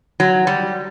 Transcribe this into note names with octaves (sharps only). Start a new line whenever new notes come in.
F#3
G3